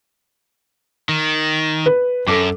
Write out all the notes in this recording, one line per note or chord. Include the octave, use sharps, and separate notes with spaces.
D#3
B4
F#2 A4 D6